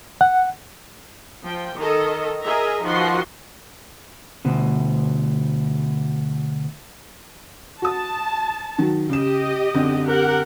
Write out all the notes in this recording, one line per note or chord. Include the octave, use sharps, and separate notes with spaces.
F#5
F3 G5
D#3 A4 D#5
G#4 A#4 D#5 E5 A#5
D#3 F3 F#4 B4 F#5 C6
D2 B2
F#4 A5 D#6
D#3 F#3
C#3 G4 D#5 E7
F#2 D3 C4
G4 A#4 F#5